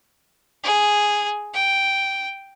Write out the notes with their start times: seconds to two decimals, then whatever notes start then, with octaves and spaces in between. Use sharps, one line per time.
0.64 G#4
1.54 G5